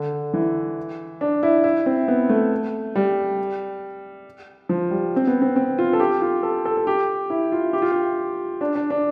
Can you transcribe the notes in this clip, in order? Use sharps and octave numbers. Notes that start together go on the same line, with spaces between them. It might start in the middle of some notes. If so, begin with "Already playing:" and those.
Already playing: D3
E3
D4
E4
E4
C4
B3
A3
G3
F3
G3
C4
B3
C4
C4
F4
A4
G4
F4
A4
A4
A4
G4
E4
F4
G4
F4
G4
D4
D4
D4